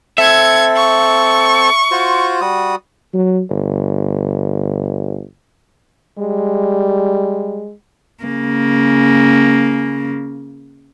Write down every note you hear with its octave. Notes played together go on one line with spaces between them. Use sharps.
C4 A4 E5 G#6 C#7
C#6
F4 F#4 C5
G3 F#4 D#6
F#3
G1
G3 G#3
C#3 A#3